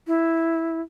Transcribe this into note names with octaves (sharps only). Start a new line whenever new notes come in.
E4